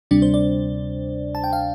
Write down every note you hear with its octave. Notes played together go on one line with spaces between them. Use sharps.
D2 C3 G3 D4 D5
C5
D5
A5
G5
F5